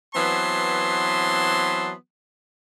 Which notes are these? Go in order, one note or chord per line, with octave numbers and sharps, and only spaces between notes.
E3 F#3 B3 C4 A5 C6